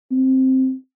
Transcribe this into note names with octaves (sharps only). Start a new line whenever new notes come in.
C4